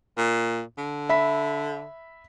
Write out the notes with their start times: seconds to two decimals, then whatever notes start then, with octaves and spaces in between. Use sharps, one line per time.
0.17 A#2
0.78 D3
1.09 E5 B5 B6